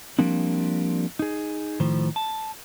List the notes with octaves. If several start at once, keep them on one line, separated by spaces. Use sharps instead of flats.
F3 G3 A#3 C4 D4
D#4 G#4
A2 D#3 F3 C5
A5